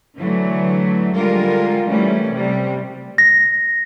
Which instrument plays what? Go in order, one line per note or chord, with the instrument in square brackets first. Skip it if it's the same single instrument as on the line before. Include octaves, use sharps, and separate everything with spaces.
[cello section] D3 E3 F#3 A3
D3 G3 G#3 F4 A#4
E3 G3 A3 C#4
C3 G3
[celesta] A#6